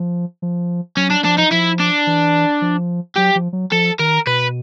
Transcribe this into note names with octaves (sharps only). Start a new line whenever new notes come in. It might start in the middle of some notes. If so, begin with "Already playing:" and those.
Already playing: F3
F3
F#3 C#4
D4
F3 D4
D#4
F3 E4
D4
E3
F3
F#3 G4
F3
F#3
F3 A4
D#3 A#4
B2 B4